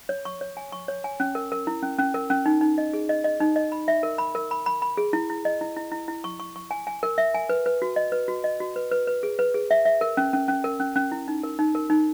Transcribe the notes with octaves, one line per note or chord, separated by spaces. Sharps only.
C#5
C#6
C#5
G#5
C#6
C#5
G#5
C#4
A#4
A#4
E4
C#4
C#4
A#4
C#4
D#4
D#4
D#5
G#4
D#5
D#5
D#4
D#5
B5
E5
A#4
B5
A#4
B5
B5
B5
G#4
E4
E4
D#5
E4
E4
E4
E4
C#6
C#6
C#6
G#5
G#5
A#4
E5
G#5
B4
B4
F#4
D#5
B4
F#4
D#5
F#4
B4
B4
B4
G#4
B4
G#4
E5
E5
A#4
C#4
C#4
C#4
A#4
C#4
C#4
E4
D#4
A#4
D#4
A#4
D#4